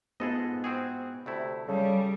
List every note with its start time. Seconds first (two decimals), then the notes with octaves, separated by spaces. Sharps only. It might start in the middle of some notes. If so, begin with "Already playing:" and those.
0.20 G#2 B3 F4 G#4 A4 B4 D#5
0.64 C4 F#4 G#4
1.26 D2 C3 A3 E4
1.68 C#3 G3 A4